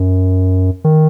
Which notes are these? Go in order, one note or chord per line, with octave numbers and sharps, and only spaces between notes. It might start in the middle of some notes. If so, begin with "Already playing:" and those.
Already playing: F#2
D#3